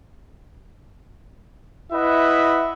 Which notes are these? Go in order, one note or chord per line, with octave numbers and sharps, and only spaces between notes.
E4 B4 D#5 E5 F#5